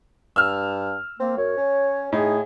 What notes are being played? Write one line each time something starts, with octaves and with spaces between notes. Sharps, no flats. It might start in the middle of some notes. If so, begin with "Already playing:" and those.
G2 E6 F6
A#3 C4
F#2 C#5
C#4
A2 D#4 G#4